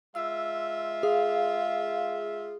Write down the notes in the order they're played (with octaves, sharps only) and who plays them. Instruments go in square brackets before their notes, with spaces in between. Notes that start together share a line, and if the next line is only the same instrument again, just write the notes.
[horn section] G#3 F4 E5 [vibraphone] E6
[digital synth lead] G#4 [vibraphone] F5